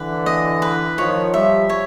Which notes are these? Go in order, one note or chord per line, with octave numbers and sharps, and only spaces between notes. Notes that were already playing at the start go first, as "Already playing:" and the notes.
Already playing: D3 E3 B4
D#5
B4
D#3 F3 C#5
F3 G3 E5
C#5